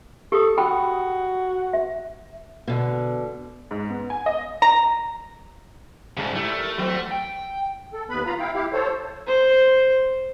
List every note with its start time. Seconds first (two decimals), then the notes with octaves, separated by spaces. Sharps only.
0.32 G4 A4 D#6
0.58 F#4 A4 G5 B5
1.73 E5
2.67 B2 D3
3.71 G#2
3.90 B3
4.10 G#5
4.26 D#5
4.62 A#5
6.17 G#2 C#3 G3 G#3
6.35 G3 A3 E4
6.57 A#4
6.78 F3 B3
7.11 G5
7.94 A4
8.10 D#2 B3 B4 B5
8.26 F4 F5 A#5 B5
8.39 E4 F5 G5
8.54 E4 G4 F5
8.73 A4 C5 C#5
9.27 C5